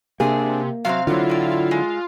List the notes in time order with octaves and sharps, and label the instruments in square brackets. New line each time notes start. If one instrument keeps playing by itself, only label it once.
[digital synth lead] C3 [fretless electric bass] A#3 [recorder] D4 [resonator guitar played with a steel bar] G#4
[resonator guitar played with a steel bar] C3 C4 [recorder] F#3 [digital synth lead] F5
[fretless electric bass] D3 F#3 [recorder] E4 [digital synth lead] F4
[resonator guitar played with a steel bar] A2 D5
G#3